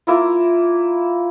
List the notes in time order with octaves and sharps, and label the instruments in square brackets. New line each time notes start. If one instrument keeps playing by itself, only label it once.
[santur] A#3 E4 F4